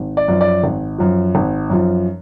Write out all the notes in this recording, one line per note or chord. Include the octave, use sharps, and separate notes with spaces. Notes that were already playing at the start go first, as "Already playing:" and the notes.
Already playing: G#1
D5
F#2 F3
D5
G#1
F#2 F3
G#1
F#2 F3